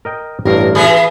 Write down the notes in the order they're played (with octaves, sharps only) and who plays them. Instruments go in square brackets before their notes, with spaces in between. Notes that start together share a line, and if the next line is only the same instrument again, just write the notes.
[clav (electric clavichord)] A#4 D#5 G5
[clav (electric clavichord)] A1 G2 F5 [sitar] A#4
[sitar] E3 G#4 B4